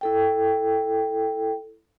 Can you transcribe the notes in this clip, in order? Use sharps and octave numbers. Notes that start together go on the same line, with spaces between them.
E4 A4 G5